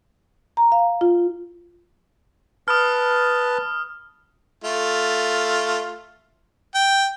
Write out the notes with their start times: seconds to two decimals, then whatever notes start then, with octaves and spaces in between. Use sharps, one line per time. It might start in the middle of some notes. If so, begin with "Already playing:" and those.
0.57 A#5
0.72 F5
1.01 F4
2.68 B4 A5 D#6 F6
4.64 A3 F4
6.75 G5